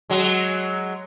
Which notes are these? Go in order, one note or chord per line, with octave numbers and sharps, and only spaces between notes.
F#3 G#3